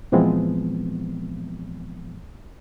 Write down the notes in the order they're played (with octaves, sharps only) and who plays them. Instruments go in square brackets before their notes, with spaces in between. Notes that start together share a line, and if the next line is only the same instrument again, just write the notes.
[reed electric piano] A#2 E3 F3 G#3 B3 C4